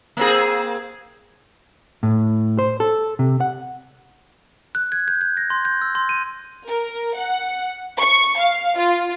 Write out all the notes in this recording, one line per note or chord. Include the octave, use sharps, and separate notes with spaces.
A#3 C4 G#4
A2
C5
A4
C3
F#5
F#6
G#6
G6
G6
A#6
C6
G6
E6
C6
D#7
A#4
F#5
C#6
F5
F4